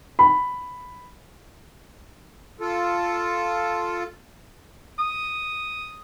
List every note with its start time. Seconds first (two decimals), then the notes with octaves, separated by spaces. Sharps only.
0.19 B5
2.60 F4 A4
4.99 D#6